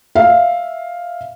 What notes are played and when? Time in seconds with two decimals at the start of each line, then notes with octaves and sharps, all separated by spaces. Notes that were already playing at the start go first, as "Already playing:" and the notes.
0.15 E5 F5